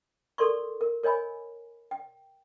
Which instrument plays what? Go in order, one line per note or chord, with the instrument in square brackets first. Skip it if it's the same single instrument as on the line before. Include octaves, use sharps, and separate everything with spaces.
[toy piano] A4 A#4 D5 C6 C#6
A#4
A#4 C#5 D#5 G#5 B5
G5